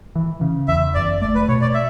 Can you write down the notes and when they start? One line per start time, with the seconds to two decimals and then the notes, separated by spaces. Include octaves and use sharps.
0.16 E3
0.41 C#3
0.68 E2 E5
0.94 F#1 D5
1.21 A3 D5
1.35 B4
1.48 B2 C#5
1.61 D5
1.74 E5